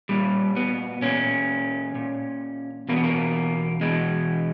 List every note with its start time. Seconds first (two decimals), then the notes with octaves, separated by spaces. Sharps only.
0.09 A#2 G3
0.56 B3
1.02 A#2 C#4
1.95 A#2
2.89 E2 B2 A#3
2.96 B3
3.04 A#3
3.81 E2 B2 G#3